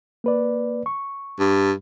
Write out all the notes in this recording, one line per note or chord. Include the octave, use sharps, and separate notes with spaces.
A#3 B4 D5
C#6
G2